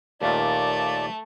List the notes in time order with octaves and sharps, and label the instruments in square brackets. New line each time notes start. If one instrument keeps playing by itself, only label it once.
[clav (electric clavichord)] D#2 A#2 [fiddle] A3 [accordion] D5